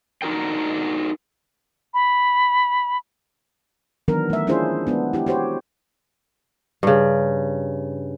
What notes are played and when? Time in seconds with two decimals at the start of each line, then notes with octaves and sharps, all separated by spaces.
0.22 D4 D#4 F#4 A#4 G5
1.94 B5
4.08 D#3 E3 F#3 B3 D4 A#4
4.30 A3 E5
4.47 C#4 D4 E4 F4 G#4 C5
4.87 G#3 B3 D4
5.13 E4 G4
5.27 F#4 G4 C5 C#5
6.83 G2 C#3